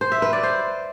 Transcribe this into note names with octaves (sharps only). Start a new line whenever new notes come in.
C5
E5
B4
D5
C5